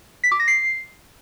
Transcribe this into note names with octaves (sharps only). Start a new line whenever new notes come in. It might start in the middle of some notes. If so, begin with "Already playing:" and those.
B6
D6
A#6
C7